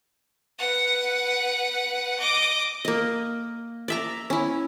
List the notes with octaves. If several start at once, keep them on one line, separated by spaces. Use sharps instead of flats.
B4 F#5
D#5 D6
A#3 D#5
D5 E5 A#5
C#4 E4